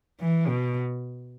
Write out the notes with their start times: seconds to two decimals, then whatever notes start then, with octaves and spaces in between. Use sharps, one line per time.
0.20 E3
0.48 B2